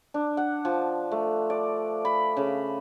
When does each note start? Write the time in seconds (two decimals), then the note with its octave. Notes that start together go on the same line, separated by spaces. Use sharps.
0.14 D4
0.37 F#5
0.65 F3
1.12 A3
1.50 D5
2.05 B5
2.37 C#3